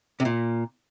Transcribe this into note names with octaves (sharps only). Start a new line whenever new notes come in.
C3
A#2